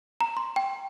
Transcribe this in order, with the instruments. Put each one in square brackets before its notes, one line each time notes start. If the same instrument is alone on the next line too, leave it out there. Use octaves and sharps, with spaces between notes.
[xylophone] A#5
C6
G5